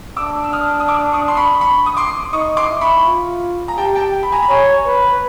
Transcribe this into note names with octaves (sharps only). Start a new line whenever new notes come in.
D4 D6 E6
E6
D#6 F6
D#6
D6 E6
C#6 D#6
C6
B5 C#6
B5 C#6
D#6
C6 D6
D#4 C#6 D#6
C6 D6
E4
B5 C#6
F4
A#5
G4 G5 A5
G5 A5
B5
G#5 A#5
B5
C#5 G#5 A#5
B4